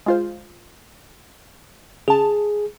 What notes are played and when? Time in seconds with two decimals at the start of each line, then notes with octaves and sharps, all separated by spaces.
0.06 G#3 F4 C5
2.08 C#3 G#4 A5